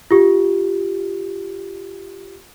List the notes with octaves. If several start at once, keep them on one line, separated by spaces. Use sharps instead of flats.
F4 G4